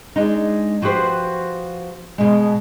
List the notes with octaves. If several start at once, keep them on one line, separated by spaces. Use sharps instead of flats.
G#3 D4 D#4
F3 F#4 G4 B4 C5
B2 G#3